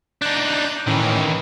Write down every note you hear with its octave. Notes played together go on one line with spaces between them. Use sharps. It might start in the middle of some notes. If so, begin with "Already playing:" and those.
D4 D#4 F#6 G6 A6
A2 D#3 E3 C#4